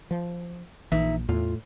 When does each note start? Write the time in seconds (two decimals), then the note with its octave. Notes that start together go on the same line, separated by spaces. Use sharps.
0.11 F3
0.92 A#1 E3 D#4 E5
1.29 E2 A2 F4